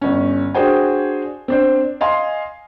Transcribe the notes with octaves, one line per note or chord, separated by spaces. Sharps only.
G1 C#4
D4 F#4 G#4 C5 G5 G#5
C4 D4 C5
D#5 F5 G#5 C6